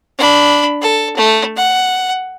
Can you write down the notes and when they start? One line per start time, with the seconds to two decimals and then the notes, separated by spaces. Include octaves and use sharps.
0.18 D4 B5
0.82 A4
1.16 A3
1.56 F#5